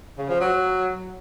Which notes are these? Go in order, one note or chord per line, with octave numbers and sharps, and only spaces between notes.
C#3
F3
F#3